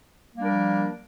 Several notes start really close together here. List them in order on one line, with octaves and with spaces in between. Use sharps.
A#3 G3 D4 A#4 F3